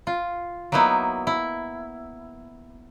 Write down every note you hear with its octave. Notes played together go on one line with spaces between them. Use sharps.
F4
F#3 A#3 B3 D#4 E4
E4